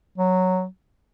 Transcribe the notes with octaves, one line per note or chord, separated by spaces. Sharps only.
F#3